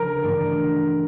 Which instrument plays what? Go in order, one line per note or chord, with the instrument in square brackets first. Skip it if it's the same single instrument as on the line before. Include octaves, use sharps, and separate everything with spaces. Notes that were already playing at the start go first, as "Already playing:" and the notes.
Already playing: [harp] D2 C#3 F3 C#4 [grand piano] A#4
[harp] G2 E3 A3 D4